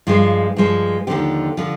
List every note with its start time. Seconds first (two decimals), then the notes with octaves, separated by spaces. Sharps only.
0.07 G2 F3 G#3 F4
0.56 G2 F3 G#3
1.07 D#2 D3 F3 G4
1.57 D3 F3